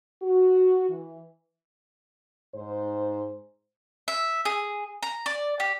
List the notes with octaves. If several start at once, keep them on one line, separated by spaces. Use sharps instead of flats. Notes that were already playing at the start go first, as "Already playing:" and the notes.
F#4
E3
G#2 C5
E5
G#4
A#5
D5
G4